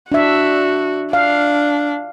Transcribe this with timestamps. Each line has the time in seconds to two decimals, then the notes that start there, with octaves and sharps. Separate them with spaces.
0.12 D4 F#4 E5
1.13 D4 F5